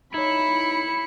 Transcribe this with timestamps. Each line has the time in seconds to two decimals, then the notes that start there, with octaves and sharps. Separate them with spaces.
0.14 D#4 E4 C#5 B5 C#7